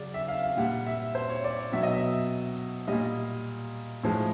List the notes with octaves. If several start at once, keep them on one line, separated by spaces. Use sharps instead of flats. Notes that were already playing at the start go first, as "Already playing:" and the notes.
Already playing: C#3 F#3 D5
E5
F5
F5
A#2 G3 F#5
E5
C5
C#5
D5
B2 F#3 E5
D#5
E5
A#2 G3 D#5
A2 F3 G#3